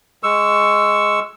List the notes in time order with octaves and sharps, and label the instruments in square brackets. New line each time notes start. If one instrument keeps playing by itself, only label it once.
[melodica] G#3 C#6 E6